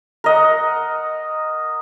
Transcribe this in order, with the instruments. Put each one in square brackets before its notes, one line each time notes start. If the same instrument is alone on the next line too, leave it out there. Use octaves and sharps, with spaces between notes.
[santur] A#4 D#5 F#5